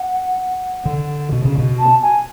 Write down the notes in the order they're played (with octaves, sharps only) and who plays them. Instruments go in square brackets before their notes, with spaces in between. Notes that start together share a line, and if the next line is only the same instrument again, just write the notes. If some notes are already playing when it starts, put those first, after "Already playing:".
Already playing: [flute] F#5
[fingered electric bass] D3
B2
C#3
B2
[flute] A5
G#5